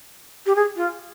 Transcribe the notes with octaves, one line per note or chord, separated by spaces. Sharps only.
G4
G#4
F4